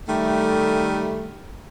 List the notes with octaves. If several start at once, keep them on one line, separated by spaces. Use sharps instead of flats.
D#3 G3 A3